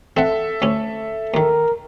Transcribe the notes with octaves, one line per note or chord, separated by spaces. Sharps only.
C4 A4 E5 F#5
D2 C#4
D#2 D#3 A#4